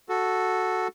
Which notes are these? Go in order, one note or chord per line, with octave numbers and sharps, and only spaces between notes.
F#4 A4